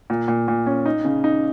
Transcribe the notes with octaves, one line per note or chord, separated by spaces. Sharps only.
A#2
A#2
A#2
C#4
D#4
C#3
D#4